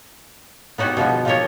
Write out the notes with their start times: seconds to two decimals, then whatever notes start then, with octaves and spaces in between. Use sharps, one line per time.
0.78 B3 D#4 F#4 G4 G#5
0.97 B2 F3 G#3 B3
1.25 F3 D#4 F4 G4 A#4 C#5